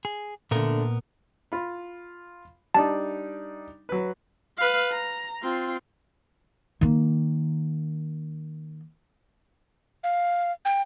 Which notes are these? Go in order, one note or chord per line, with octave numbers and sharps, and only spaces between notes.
G#4
A#2 D3 A3 B3 A#4
F4 B5
G3 D4 D#4 A5
F#3 B4
B4 F5
A#5
C4 F4
D#3 A#3
F5
G5